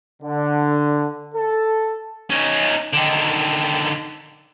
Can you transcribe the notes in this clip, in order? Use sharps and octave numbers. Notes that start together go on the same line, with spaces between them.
D3
A4
C#4 D#4
D3 D#3